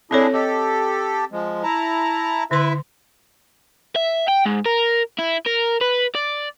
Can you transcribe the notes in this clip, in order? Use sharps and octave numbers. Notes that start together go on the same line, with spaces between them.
C4 D4 E4 G#4 A4 C#5
G4 A4 D#5
F3 G#3
E4 A5 A#5
D3 E4 B4 E5 C6
E5
G5
G#2
A#4
E4
A#4
B4
D5